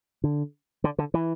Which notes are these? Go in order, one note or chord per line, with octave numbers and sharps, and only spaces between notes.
D3
D3
D3
E3